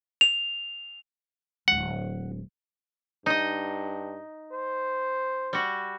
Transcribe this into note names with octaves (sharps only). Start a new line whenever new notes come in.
F7
D1 G#3 F#5
G2 D#4 D#5
C5
G3 F#4